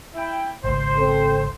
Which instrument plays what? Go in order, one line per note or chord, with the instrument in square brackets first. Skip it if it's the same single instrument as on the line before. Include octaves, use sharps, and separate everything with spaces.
[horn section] E4 G5
[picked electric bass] G#1 C#2 [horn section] C5
[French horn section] C4 A4